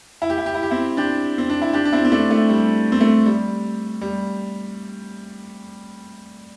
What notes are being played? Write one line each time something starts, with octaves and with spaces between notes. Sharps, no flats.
E4
G4
E4
G4
E4
G4
C4 E4
D4 G4
C4
D4
E4
D4 G4
D4
C4 E4
C4
A3 D4
A3
G3
C4
A3
G3
G3